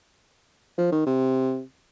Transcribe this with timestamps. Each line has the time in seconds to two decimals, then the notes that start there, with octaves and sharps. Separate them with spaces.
0.78 F3
0.92 D#3
1.07 C3